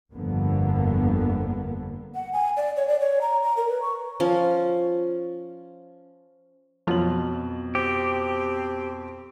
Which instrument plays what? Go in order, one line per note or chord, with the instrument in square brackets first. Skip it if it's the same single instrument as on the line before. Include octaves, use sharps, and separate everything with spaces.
[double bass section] G1 F2 D3 A#3 B3
[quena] F#5
G#5
D5
C#5
D5
C#5
A#5
A#5
A#4
B4
C#6
[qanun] F3 C#4
[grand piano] F2 B2 F#7 [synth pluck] F3 F#3 F4
[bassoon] C4 [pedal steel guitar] G4